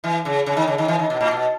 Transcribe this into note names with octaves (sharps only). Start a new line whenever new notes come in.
E3
C#3
C#3
D#3
C#3
D#3
E3
D#3
B2
A2
B2